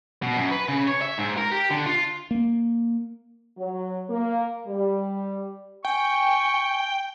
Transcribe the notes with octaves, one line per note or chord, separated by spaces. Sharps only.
B2
F#2
B4
C#3
C#5
E5
G#2
A#4
G4
D3
F4
A#3
F#3
A#3
G3
G5 G#5 C#6